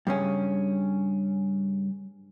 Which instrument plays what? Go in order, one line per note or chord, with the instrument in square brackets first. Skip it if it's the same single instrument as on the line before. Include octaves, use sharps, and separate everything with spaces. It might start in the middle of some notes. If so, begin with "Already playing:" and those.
[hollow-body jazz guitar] G2 C#3 C#4